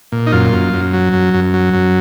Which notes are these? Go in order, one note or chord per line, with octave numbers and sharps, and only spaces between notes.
A#2
D#4
F#2 F4
F#2
F#2
F#3
F#2
F#2
F#3
F#2